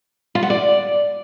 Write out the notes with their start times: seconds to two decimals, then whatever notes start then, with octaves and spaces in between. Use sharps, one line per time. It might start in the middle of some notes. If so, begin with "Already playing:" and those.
0.35 F4
0.43 F#5
0.50 D5